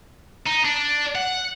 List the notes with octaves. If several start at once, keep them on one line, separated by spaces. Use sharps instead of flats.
D#4
D4
F#5